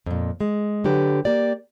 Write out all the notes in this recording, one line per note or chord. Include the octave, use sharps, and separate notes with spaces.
F2 A#2
G#3
D3 F#3 G4 B4
A#3 G4 D5